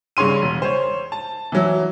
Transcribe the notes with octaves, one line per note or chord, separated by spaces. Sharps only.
G2 C#3 C#5 C6 D#7
E1
C5 C#5
A5
E3 F#3